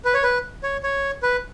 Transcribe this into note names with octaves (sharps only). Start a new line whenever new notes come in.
B4
C#5
B4
C#5
C#5
B4